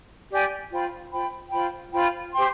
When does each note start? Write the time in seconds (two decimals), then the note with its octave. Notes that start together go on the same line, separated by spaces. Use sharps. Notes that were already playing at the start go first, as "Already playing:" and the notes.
0.30 G4 D5 G#5
0.71 F4 C5 G5 B5
1.11 F4 C5 G5 B5
1.52 F4 C5 G5 B5
1.92 F4 C5 G5 B5
2.32 G4 C5 G5 C6